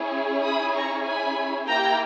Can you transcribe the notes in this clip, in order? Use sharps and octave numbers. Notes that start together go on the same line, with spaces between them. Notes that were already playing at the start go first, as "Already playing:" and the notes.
Already playing: C#4 E4 G#4
B5 D#6
A#5 C#6
G#5 B5
A#3 E4 G4 G5 A#5